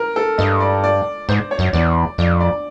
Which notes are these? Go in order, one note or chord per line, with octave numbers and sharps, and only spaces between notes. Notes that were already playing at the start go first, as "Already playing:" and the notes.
Already playing: A#4
A4
G2 D#5
D5
D5
G#2 C5
C#5
F#2
E2 D5
F2 D5
D5